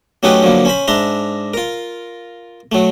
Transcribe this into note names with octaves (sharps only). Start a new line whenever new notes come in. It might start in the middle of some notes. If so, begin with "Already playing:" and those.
F#3 A3 C#4 D#4 G4 B4
D3 F3 F#3 A#3
C#4 C5 B5
G#2 D4 E5 A#5 C6
F4 A#4
F#3 A3